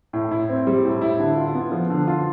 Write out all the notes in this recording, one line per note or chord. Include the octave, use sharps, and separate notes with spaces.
A2
E4
C4
G3
A2
E4
D3
F4
B3
F3
D3
F4